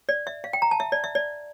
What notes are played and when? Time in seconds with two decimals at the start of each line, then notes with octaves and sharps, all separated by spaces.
0.09 D5
0.27 E5
0.44 F5
0.53 G5
0.62 A#5
0.71 A5
0.80 E5
0.92 D5
1.04 E5
1.15 D5